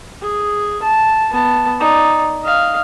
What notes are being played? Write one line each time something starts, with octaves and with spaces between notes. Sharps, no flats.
G#4
A5
B3 A5
D#4 D5
D#5 F5